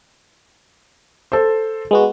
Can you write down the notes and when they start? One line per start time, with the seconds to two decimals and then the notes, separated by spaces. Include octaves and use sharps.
1.32 A4 C5
1.91 G#3 B3 F#4